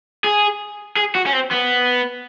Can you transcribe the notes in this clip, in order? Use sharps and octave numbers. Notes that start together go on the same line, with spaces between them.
G#4
G#4
F#4
C#4
C4
B3